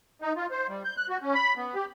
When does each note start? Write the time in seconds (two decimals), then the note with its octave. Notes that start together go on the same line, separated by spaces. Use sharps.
0.22 D#4
0.36 F4
0.51 C5
0.68 G3
0.84 G6
0.97 F#6
1.09 F#4
1.22 C#4
1.34 B5
1.57 B3
1.75 G4